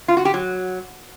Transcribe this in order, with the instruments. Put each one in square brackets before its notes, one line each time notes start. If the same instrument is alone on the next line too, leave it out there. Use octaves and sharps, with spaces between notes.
[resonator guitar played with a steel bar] F4
F#4
G4
F#3